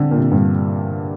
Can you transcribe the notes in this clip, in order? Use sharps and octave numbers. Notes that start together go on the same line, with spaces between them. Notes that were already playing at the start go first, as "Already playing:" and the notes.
Already playing: D3 C4 D4
A#2
C3
G2